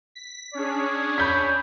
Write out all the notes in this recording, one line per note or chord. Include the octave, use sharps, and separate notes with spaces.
B6
C#4 D4 G#4 C#5
B5 G6 B6